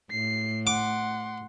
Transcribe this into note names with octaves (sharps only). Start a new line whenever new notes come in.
A2 C7
F#5 C6 D6